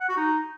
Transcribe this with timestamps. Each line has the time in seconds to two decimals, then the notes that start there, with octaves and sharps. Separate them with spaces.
0.01 F#5
0.09 F#4
0.17 D#4